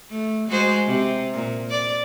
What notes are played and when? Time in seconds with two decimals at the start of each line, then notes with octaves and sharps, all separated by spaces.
0.10 A3
0.48 G#3 F#4 C5
0.86 C3
1.34 A#2
1.70 D5